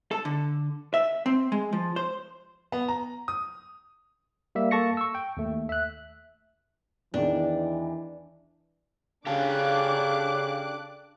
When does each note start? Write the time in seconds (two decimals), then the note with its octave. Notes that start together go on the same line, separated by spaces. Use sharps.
0.11 A4
0.25 D3
0.94 E5
1.26 C4
1.52 G#3
1.73 F3
1.96 C5
2.72 B3
2.88 A#5
3.28 D#6
4.55 G3 A#3 E5
4.71 A#3 A4 A5 C#6 A#6 C#7
4.97 C#6 E6
5.15 G5
5.37 D#2 A3
5.69 E5 F#6
7.14 E2 D#3 E3 D4
9.27 C#3 D4 G4 A4 F5 D6 F#6